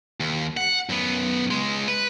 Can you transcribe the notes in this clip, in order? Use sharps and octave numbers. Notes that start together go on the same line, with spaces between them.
D#2
F#5
F#2 B3
C#2 G#3
B4